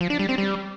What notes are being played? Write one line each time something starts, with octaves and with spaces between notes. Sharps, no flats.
F3
D4
G3
C4
G3